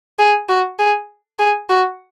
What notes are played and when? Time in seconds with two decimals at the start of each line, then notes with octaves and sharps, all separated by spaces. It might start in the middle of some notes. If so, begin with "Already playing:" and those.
0.19 G#4
0.49 F#4
0.79 G#4
1.39 G#4
1.69 F#4